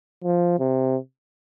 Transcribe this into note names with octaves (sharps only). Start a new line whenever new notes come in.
F3
C3